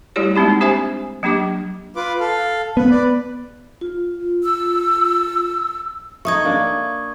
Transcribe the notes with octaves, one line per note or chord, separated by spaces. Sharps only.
G3 A3 E4 F#4 G4 C#5
G#3 A#3 C4 D#4 G4
D4 G4 C5 E5 G#5
F#3 A#3 D4 G4 D6
F4 B4 D6
A4 F5
B3 B4
B4 D5
F4
E6
A3 D#4 C#6 D#6 G#6
A#3 D4 D5